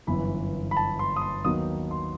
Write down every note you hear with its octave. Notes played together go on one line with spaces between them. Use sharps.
G1 F#2 E3 B3 B5
B5
A5
C6
D#6
C6
D#2 D#3 F#3 B3 D#4 D#6
C6